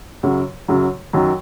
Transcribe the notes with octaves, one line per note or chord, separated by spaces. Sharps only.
F#2 C#3 F#3
F#2 C#3 F#3
F#2 D#3 F#3